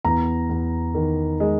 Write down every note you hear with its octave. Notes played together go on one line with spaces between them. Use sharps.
E2 A#5
E2
D#3
G#3